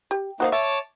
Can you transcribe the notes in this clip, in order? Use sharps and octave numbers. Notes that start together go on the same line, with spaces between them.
G4
A#3 D#4 F#4 C5 F5
C#5 E5 A5 D6